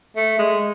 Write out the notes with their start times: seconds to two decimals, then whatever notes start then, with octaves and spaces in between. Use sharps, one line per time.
0.16 A3
0.39 G#3